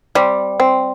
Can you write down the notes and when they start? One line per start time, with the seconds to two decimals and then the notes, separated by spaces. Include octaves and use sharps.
0.15 G3 C4
0.60 C4